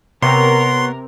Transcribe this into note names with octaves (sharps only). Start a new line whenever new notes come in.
C3 B3 A#4 C#5 C6